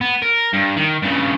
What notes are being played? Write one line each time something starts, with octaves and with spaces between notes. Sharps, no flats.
B3
A#4
G2
D#3
G2 C#3